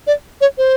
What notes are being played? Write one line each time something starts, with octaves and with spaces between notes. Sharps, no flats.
D5
C#5
C5